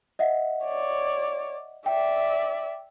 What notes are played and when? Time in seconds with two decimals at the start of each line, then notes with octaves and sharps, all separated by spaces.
0.19 D#5 E5 F#5
0.65 C#5 D5
1.86 D5 E5 G5